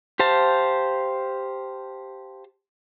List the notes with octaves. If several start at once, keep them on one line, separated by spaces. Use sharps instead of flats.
G4 C5 F5 A5